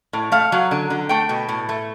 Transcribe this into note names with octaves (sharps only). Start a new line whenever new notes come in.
A2
A3 F5
F#3
D3
D3
A3 G5
B2
A2
A3